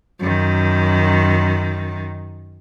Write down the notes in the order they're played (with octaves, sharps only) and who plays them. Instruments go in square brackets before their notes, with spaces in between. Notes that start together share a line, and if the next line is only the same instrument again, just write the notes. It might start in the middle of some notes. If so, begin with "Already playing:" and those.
[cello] F#2 D#3